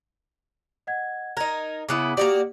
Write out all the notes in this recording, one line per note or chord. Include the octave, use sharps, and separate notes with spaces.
D#5 F#5 G#6
D#4 A#4 A#5 G#6
C#3 B3 E4 D6 D#6
A#3 F#4 G4 D5